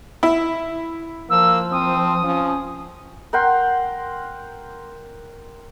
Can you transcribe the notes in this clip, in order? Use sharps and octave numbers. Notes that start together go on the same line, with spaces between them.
E4
F3 A#3 E6
C4 D#6
F3 C#4
A#4 F#5 G5 C6